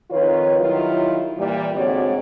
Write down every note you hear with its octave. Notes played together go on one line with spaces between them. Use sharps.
F2 D#3 F4 B4 C#5
D#3 F#3 G3 E4 F4
A#2 E3 G3
G#2 D3 C4 F#4 C#5 D5